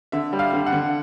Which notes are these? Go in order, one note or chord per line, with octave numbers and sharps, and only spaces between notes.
D3 E5
G3
F5
D3
F#5
D3